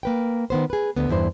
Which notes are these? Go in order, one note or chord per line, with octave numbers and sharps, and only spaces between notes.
A#3 B4 G5
D#3 B3 C5
G#4 B4
D2 D3 B3
E2 G2 E4 C5